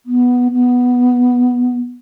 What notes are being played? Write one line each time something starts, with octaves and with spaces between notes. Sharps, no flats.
B3
B3